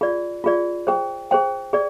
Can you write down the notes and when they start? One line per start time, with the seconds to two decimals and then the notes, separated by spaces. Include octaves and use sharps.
0.01 F4 G#4 D5
0.44 F4 G#4 D5
0.87 G#4 C5 G5
1.31 G#4 C5 G5
1.73 G#4 D5